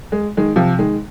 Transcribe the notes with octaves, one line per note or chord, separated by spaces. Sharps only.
G#3
D#3 G#3
C3 F3
D#3 G#3